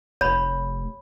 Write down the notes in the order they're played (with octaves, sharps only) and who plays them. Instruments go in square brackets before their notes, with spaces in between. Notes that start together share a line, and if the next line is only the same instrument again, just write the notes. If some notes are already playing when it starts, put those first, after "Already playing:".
[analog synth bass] F1 [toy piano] C#5 B5